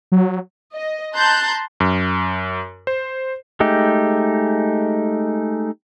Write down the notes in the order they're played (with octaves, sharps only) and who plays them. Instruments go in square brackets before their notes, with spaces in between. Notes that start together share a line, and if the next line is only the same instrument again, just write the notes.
[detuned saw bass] F#3
[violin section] D#5
A5 A#5 C6 F#6 G6
[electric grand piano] F#2
C5
[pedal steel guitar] G#3 A3 D#4 G4